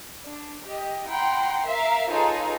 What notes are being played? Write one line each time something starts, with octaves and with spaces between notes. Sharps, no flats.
D4
G4 D#5
E4 F#5 G5 A#5 C6
A#4 E5 F5 A#5
D#4 F4 G#4 A4 B4 C#5